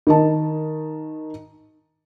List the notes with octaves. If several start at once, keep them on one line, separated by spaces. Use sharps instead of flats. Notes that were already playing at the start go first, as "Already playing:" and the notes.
D#3 D#5 A5